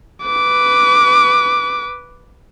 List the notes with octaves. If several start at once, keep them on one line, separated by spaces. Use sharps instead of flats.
B4 D6